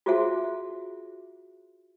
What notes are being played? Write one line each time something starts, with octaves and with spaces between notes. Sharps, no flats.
F4 F#4 G#4 C5 E5 F#5